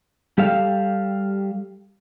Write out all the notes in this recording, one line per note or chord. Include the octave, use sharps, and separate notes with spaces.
G3 G4 A4 F5